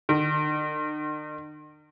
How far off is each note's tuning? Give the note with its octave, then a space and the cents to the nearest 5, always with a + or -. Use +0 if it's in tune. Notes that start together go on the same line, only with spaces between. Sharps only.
D#3 -45